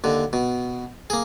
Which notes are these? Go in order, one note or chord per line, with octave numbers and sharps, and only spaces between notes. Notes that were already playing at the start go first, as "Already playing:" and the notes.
D#2 D3
B2
A#3 G#4